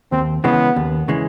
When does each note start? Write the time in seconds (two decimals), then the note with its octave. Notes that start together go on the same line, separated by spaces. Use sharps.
0.12 D#2 C4
0.44 C#3 E3 G#3 B3
0.76 D#2
1.08 C#3 E3 G#3